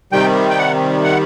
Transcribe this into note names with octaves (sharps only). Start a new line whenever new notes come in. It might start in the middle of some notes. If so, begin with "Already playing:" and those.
C3 D#3 G3 G5
G5
F#5
F#5